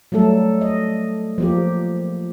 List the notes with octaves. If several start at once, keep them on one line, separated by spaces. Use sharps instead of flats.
F#3 G3 A3 A4
D#5
F3 A#3 G4